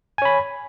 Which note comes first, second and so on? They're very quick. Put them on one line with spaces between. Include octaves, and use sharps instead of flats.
G#5 C#5 B5